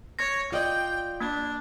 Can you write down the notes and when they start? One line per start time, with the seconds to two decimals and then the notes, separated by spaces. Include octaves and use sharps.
0.19 C#5 A#6
0.52 F4 D5 D#5 G5
1.20 A#3 D4